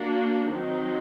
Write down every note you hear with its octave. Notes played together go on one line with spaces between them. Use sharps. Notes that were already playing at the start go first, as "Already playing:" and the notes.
Already playing: A#3 D4 F#4
D#3 F#3 C4 D#4